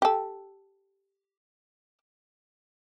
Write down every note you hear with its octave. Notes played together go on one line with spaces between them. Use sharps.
G4 A4